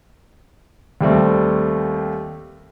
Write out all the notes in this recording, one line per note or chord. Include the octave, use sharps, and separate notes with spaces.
D#2 G3 A3 C4